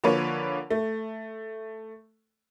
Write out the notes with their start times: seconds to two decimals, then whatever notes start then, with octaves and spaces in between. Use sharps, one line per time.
0.04 D3 F3 A#3 B4 C#5
0.71 A3